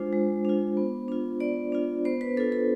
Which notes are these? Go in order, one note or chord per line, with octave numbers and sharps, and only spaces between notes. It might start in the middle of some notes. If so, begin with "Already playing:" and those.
Already playing: G#3 D4 F4 C5
G#3
D4 F4
B3
D4 F4
B3 D5
D4 F4
B3 C5
B4
D4 F4 A4
A4